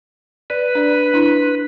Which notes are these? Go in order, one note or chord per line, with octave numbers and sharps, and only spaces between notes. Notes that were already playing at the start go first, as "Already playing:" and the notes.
B4 D5
D4 D5
D4 E4